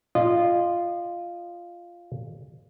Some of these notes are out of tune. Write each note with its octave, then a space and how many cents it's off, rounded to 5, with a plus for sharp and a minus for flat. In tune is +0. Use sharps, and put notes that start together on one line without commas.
F4 -5 D#5 -30